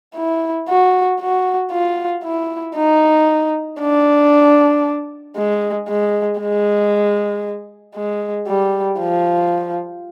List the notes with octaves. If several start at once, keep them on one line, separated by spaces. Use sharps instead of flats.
E4
F#4
F#4
F4
E4
D#4
D4
G#3
G#3
G#3
G#3
G3
F3